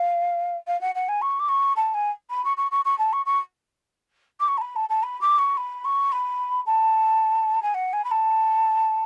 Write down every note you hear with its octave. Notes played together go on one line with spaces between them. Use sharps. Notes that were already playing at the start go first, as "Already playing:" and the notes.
Already playing: F5
F5
F#5
F#5
G#5
C#6
D6
C#6
A5
G#5
B5
C#6
C#6
C#6
C#6
A5
C#6
C#6
D6
C#6
A5
B5
A5
A5
B5
D6
C#6
B5
C#6
B5
A5
G#5
F#5
G#5
B5
A5